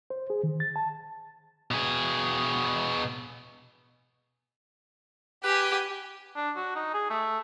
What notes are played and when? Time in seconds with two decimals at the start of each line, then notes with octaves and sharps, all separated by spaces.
0.10 C5
0.30 G#4
0.43 D#3
0.60 A6
0.76 A5
1.71 B2 G#4
5.44 G4 B4 G#5
6.36 D4
6.56 F#4
6.75 D#4
6.94 G#4
7.10 A3